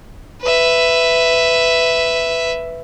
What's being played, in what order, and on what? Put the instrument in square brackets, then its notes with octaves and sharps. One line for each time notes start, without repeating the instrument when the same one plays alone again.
[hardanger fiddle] B4 E5